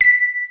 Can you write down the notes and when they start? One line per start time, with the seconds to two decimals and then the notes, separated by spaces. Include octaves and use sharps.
0.01 B6